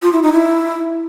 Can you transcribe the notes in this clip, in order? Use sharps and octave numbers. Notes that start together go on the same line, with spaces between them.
F4
E4
D#4
E4